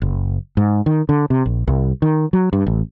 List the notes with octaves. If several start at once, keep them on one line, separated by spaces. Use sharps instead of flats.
F#1
G#2
D#3
D3
C3
A#1
C2
D#3
F#3
G2
A1